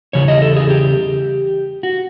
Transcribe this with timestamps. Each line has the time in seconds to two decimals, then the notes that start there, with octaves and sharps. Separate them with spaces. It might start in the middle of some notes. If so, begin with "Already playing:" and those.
0.13 E2 C#3 E3 G3 C#5
0.28 D#5
0.42 A4
0.57 G#4
0.70 G4
1.83 F#4